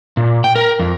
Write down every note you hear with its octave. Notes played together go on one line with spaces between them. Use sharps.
A#2
G5
A#4
F2